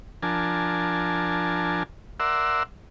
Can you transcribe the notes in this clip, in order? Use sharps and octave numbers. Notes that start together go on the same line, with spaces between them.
F3 D4 A#4 G#5 A5
A#4 D5 E5 F#5 C6 E6